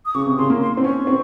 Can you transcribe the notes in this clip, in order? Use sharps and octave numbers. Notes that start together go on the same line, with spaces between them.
D#6
C#3 C#6
C3
C#3 C6
A#3
C6
C4
C#4 C#6
C4